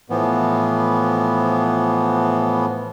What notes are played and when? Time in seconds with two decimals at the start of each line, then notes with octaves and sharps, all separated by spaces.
0.10 A2 E3 F3 B3